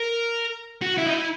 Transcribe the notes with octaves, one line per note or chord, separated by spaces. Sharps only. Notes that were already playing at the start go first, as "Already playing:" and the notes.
Already playing: A#4
F#4
E4
D#4
E4